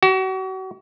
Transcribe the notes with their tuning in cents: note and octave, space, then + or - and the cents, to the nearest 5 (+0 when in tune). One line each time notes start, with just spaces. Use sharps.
F#4 +35